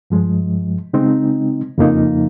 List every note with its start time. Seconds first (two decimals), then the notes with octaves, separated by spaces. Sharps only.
0.10 G2 F3 G#3
0.93 C#3 G#3 C4 D#4
1.78 F2 C#3 F3 A#3 D#4